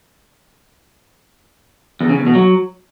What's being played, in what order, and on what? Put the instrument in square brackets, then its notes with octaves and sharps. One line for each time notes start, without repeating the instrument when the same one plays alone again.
[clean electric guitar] E2
C#3
E2
B2
F#3